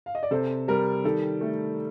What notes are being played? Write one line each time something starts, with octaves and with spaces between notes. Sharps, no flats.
F5
D#5
D5
C3 A4 C5
G3 A#4
D#3 A4
A3